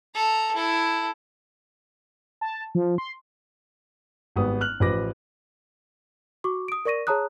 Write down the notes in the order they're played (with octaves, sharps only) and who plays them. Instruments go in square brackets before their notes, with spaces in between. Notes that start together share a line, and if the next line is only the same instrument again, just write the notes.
[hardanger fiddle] A4 A#5
E4 A4
[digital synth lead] A5
F3
C6
[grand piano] G#1 G3 B3 D#6
F6 F#6 F#7
A1 F3 B4 D6 A#6
[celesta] F#4 C#6 D6
D#6 D7
A#4 D5 C#6 A#6 D#7
G#4 C#5 A5 A#5 D#6 F#6